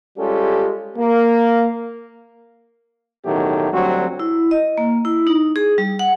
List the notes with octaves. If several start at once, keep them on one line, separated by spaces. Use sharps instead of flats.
G3 G#3 C#4 F4 G4 A4
A#3
A1 B2 D#3 F#3 A3 G4
D2 F#3 G3 C4 F#4
E4
D#5
A#3
E4
D#4
G#4
G3
F#5